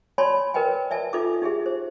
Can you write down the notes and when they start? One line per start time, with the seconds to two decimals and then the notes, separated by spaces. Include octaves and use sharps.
0.18 C#5 D5 G#5 A5 B5 C6
0.54 A#4 B4 D#5 G5 G#5
0.91 D5 E5 G#5 A5
1.13 D#4 F4 A4 E5 D6
1.42 D#4 G4 G#4 E5
1.66 C5